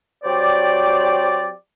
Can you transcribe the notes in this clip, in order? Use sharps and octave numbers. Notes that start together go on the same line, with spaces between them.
F#3 C4 G4 C5 D5